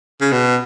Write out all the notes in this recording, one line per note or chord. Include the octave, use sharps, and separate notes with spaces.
C#3
B2